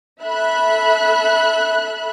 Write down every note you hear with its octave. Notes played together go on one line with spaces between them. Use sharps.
A4 E5 B5 F#6